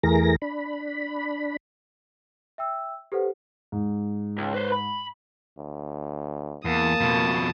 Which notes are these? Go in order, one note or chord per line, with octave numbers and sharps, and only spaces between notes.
E2 E3 A3 G#4 A#4 A#6
D4 B5
E5 G5 E6
G4 A4 B4 C5 F#5
G#2
C#2
B4 C5
B5
D2
E2 A#3 A5 D#6
F2 B2